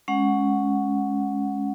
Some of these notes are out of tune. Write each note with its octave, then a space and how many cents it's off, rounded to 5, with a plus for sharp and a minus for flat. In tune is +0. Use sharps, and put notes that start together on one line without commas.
G#3 +10 C#4 +0 F#5 -5